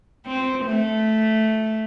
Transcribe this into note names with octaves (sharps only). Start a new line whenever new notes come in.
C4
A3